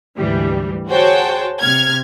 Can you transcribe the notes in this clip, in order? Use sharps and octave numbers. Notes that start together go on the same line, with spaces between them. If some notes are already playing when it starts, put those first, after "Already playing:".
D2 G#2 E3 G3
F#4 G#4 C5 C#5 G5 A5
C3 F6 G#6